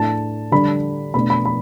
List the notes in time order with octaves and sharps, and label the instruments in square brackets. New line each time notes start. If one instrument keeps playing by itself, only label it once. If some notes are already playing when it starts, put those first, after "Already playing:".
Already playing: [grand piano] A2 A3 D4 A5
D3 G3 D4 B5
B2 A3 D4 B5
B5
B5